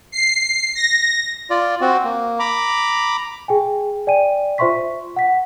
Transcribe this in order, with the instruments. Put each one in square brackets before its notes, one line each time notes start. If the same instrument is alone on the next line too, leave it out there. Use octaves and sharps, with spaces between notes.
[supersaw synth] C7
A#6
[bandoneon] F4 D5
C4 F#4
A#3
A#5 B5 D6
[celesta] G#4 G5 G#5
D5 G5 G#5 D#7
F4 C5 E5 C6 C#6 B6
F#5 B6